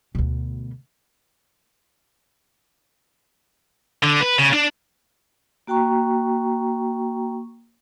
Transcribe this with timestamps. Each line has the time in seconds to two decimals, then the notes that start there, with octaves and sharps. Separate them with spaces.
0.15 D2 B2
4.03 D3
4.21 B4
4.38 C#3
4.53 D4
5.67 A#3 F#4 G5 A#5 C#6